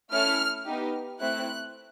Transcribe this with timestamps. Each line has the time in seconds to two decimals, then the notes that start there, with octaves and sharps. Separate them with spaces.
0.12 A3 C#4 E4 A4 F6
0.66 B3 D#4 G4
1.20 A3 C4 E4 F#6